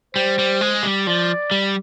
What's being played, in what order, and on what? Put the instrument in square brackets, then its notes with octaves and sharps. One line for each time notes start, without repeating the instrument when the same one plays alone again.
[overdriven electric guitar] G3 [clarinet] C5
[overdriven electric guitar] G3
G#3
G3
[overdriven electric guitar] F3 [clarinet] D5
[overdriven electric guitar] G3